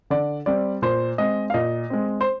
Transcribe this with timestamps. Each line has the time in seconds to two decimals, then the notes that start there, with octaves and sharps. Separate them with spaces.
0.10 D3 D5
0.46 G3 C4 D5
0.82 A#2 C5
1.18 G#3 C4 D#5
1.50 F5
1.54 A#2 D#5
1.90 G#3 C4
2.21 C5